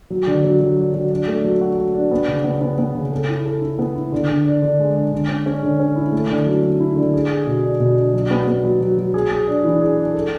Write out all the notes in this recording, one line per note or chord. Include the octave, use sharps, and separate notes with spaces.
F#3
D3
F#3
F#3
D4
F#3
D4
A3
F#3
F#4
F#4
D4
B3
C#3
B3
B3
B3
C#3
A4
E4
A4
E4
B3
E4
D3
D3
D4
D3
G#3
D4
D3
C#4
C#4
D3
C#4
E4
A3
D3
F#3
F#3
E4
D3
G#4
G#4
B2
D4
B2
D4
F#3
B3
B3
F#3
F#3
F#3
G#4
G#4
D4
E3
G#4
D4
A4